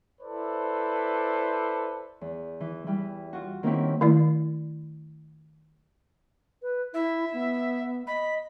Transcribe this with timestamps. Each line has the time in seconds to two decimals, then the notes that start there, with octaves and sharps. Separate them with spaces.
0.22 E4 A4 B4 C5 D5
2.21 E2
2.60 E3
2.87 E3 G3
3.33 F4 F#4
3.63 D#3 A#3 C4 C#4 E4 G4
4.01 D#3 A3 E4 D5
6.63 B4
6.94 E4 E5
7.34 B3
8.07 D#5 B5